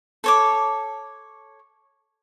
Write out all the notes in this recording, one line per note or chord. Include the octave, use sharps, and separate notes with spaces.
A4 C#5 D6